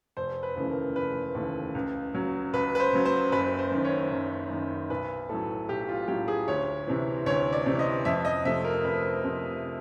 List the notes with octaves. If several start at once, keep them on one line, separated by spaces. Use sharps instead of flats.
F1 C5
B4
D#2 C#3 E3 A3
A#4
F1 B4
D#2 C#3 E3 A3
C#2
C#3 F#3
C#2 B4
B4
C5
C#3 F#3
C5
F#1 B4
C5
F#2 D#3
C#5
F#1
F#2 D#3
B1 B4
A2 F#3 A4
B1 G4
F4
A2 F#3 G4
G#4
D2 C#5
C3 E3
D2 C#5
D5
C3 E3
D#5
F2 E5
D#5
C3 F3 A3 E5
A#4
F2 B4
C3 F3 A3